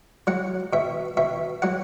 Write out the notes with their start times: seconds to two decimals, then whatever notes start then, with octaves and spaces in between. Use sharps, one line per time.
0.27 F#3 F#5
0.73 B2 E5
1.17 B2 E5
1.62 F#3 F#5